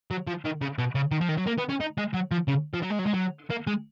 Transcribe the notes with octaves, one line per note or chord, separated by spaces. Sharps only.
F#3
F3
D#3
C#3
B2
C#3
D#3
F3
D#3
F#3
A#3
B3
C#4
D#4
G#3
F#3
F3
C#3
F3
F#3
G#3
F#3
G#3
F#3
A#3
G#3